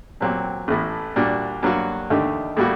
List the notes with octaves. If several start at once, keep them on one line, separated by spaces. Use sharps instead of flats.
A#2 F#3 C4 G4
A1 A2 A3
A#2 G3 D4 F#4
G2 F#3 A#3 F#4
D#2 D3 A3 D#4 G4
A2 G3 A#3 F#4